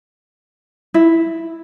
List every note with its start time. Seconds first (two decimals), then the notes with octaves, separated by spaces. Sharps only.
0.94 E4